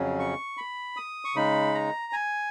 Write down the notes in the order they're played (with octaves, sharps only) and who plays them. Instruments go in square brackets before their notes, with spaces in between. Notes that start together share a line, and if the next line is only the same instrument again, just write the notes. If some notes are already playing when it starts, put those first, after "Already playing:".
Already playing: [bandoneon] F2 C#3 F#3 C#4
C#6
B5
D#6
C#6
C#3 G#3 D#4 B5
A#5
G#5